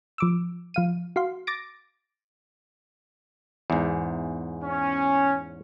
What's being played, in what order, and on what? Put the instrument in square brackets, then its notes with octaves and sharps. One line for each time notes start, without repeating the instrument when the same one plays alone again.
[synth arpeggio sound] F3 D6 E6
F3 F5 D#7
F#4 F5 C6
D6 A6 A#6 D7
[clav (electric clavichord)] E2 G#2
[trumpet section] C#4